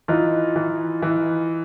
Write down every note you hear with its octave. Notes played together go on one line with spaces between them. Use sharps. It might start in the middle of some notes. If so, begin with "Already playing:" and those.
E3 D#4 F4
E3
E3